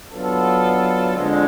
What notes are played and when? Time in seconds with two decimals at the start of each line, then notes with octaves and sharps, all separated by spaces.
0.11 F#3 B3 D4 F4 A4
1.15 F2 D3 G#3